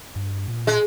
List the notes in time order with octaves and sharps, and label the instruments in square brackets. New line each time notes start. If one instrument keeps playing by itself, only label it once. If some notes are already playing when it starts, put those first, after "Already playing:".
[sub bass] G2
A#2
[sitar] G#3